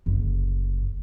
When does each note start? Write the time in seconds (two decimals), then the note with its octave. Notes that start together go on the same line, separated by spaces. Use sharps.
0.06 F#1 D2